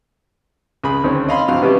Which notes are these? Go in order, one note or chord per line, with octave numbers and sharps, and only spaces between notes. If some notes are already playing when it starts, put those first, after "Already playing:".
C#2 G#4 B5
D2 D#3 C4 C#4 C#5
D#5 F5 B5 C6
G#1 D3 F#3 C4 F5
B2 G3 B3 C#4 E4 G4